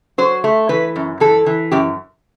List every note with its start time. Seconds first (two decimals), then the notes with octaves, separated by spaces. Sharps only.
0.18 F#3 C5
0.44 A3
0.69 E3 B4
0.96 F#2
1.20 E3 A4
1.46 E3
1.72 F#2 G4